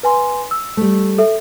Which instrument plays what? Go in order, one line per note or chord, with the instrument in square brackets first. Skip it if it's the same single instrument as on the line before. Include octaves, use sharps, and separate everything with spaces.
[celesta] B4 G#5 C6
E6
[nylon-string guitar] G3 A3
[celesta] A4 E5